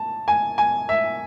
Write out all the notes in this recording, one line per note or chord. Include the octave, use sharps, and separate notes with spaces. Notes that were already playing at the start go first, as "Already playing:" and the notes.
Already playing: A5
G#5
G#5
E5